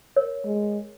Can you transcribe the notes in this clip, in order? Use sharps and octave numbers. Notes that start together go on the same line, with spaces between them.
A#4 C#5
G#3